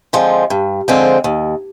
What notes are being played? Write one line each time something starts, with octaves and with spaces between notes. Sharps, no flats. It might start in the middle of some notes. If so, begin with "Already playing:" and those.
D3 F3 G#3 C4
G2
D3 F3 G#3 C4
D#2